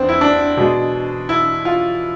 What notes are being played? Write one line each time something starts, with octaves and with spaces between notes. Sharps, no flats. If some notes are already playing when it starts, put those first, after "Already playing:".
Already playing: E2 C4 D4
E4
D4
B2 G#3
E4
F4